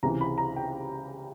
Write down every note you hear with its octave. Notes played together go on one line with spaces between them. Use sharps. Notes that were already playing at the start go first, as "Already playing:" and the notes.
C#2 C3 E3 A#5
B5
A#5
G5